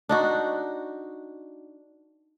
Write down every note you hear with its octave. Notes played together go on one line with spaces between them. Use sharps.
D4 D#4 F#4